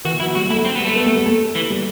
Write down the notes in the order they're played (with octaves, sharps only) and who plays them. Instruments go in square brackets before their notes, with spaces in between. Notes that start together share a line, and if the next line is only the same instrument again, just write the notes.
[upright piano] E3 [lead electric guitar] F#4
[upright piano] F#3 [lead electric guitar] E4
[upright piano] G3 [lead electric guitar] F#4
[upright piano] A3 [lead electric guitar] E4
[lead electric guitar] C4
B3
[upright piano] G3
[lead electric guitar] A3
[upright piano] B3
A3
G3
A3
[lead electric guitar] E3
[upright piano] G3